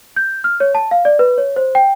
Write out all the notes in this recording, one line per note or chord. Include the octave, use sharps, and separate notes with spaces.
G6
F6
C#5
A5
F5
D5
B4
C#5
C5
G5